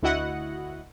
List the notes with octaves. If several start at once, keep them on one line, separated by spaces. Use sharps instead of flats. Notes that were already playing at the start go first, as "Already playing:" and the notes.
D2 E4 F#4 D#5 F#5